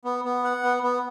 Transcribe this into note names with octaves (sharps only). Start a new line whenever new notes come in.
B3
B3
F#5
B3
B3